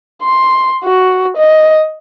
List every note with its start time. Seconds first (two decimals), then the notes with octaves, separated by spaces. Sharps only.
0.23 C6
0.84 F#4
1.37 D#5